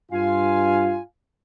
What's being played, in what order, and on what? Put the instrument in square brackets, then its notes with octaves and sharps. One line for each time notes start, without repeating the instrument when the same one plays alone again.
[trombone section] G2 F4 [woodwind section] F5 G#5